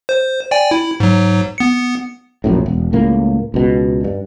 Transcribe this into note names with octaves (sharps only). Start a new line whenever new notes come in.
C5
D5 G5 G#5
E4
G#2 F#3
B3 C#7
E1 A#1 F#2 A2
E1
C#2 A2 A#3
C#2 B2
G2